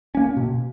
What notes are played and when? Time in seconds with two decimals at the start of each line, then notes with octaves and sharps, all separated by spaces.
0.15 A#3 C#4
0.37 B2